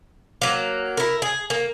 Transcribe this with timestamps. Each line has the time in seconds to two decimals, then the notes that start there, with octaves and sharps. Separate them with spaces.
0.42 F#3 A#3
0.97 E4 A#4
1.22 G#4
1.50 A#3